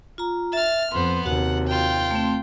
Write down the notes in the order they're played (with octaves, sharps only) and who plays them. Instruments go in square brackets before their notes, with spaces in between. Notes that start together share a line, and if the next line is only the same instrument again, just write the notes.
[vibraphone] F4 A#5
[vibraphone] E5 [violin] F6 A6
[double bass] F2 [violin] B3 C5 [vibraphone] C6
[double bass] D#2 C3 [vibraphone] F#4 [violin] F#5
[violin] F4 G5
[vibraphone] A3 C4